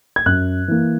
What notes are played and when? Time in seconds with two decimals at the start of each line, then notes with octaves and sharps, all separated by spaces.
0.16 G#6
0.26 F#2 F#6
0.68 E3 A#3